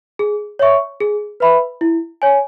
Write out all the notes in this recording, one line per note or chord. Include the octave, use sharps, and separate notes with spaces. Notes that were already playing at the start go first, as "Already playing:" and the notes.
G#4
C#5 E5 C#6
G#4
B4 E5 B5
E4
C#5 G#5